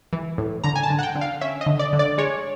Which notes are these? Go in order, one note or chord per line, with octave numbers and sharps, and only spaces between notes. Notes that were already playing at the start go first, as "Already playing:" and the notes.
E3
A2
D3 A#5
G#5
A5
D3
F#5
G5
D3
F5
C#4 E5
D#5
D3
D5
D3
D5
G#3 C#5